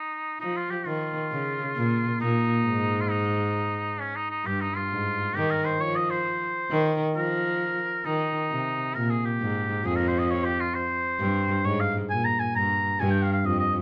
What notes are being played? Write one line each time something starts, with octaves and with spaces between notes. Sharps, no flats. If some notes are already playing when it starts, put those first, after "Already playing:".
Already playing: D#4
F3 D#4
F4
G4
D#3 F4
C#3
A#2
A#2 D#4
G#2
F4
D#4
C#4
D#4
D#4
G2 G4
D#4
F4
G#2
D#3 G4
A#4
C5
F3 C#5
D#5
C5
D#3
F3 A#4
D#3 D#4
C3
A#2 A#4
G#4
G4
G#2
F2 G#4
A#4
C5
D#5
C#5
G4
F4
C5
G2
G#2 C#5
F5
A#2 G#5
A#5
G#5
G2 A#5
G2 G#5
G5
F5
F5
F2 D#5
D#5